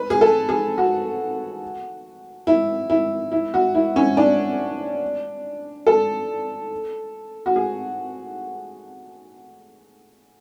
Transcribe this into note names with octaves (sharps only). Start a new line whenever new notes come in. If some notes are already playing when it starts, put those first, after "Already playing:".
Already playing: B4
G#4
A4
G#4
F#4
E4
E4
E4
F#4
E4
C#4
D4
A4
F#4
G#4